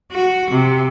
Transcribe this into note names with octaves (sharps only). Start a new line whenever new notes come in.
F#4
C3